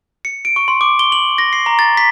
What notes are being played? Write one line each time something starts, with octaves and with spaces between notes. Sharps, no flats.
C#7
D7
C#6
C6
D6
G7
F#7
A#6
C7
A#5
A6
B6